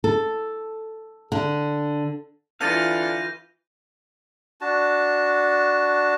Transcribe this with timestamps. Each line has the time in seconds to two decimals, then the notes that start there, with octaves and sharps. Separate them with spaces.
0.04 A4
1.32 D3
2.61 D3 E3 F4 F5 G6 A#6 D#7
4.61 D4 F#4 A5